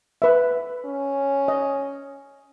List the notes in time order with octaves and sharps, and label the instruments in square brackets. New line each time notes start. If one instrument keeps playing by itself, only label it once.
[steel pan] B4 E5
[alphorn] C#4
[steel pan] D#5